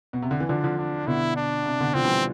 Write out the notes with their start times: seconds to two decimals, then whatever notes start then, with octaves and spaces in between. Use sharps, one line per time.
0.13 B2
0.22 C3
0.31 D3
0.40 E3
0.49 D3 F3 D4
0.64 D3 F3
0.78 D4
1.07 B2 D3 E4
1.36 D4
1.65 C3
1.80 B2 D3
1.94 D3 F3 C4
2.04 E3 G3